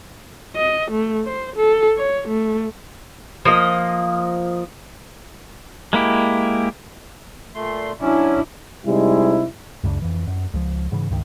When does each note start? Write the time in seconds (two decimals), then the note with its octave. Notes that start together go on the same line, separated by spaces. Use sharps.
0.56 D#5
0.91 A3
1.25 C5
1.56 A4
1.97 C#5
2.28 A3
3.45 F3 A#3 D#5
5.93 G#3 A#3 E4 G4
7.55 A#2 A3 C6
8.01 F#3 C#4 D4 E4
8.86 C3 G3 G#3 D#4 E4
9.83 C#2 F#2 C#3 D4
10.02 F2 E3
10.27 F#2
10.54 C#2 F3
10.92 G#2 C#3 E3
11.10 C#2 G2 D#3